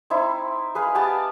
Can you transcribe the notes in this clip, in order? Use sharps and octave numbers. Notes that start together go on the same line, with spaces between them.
C4 D#4 E4
G#4 B4 F5
B3 G4 G#5 A5